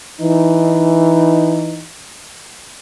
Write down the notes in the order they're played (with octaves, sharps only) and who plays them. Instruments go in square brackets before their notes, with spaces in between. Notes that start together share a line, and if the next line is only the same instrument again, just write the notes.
[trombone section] E3 D#4